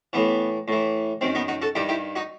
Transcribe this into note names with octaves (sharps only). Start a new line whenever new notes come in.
A2 E3 B3
A2 E3
F#2 D#3 C4
B3 D#4
D#4 F#4
F#4 A4
G2 D#3 E4 G4
E4 G4
D#4 F#4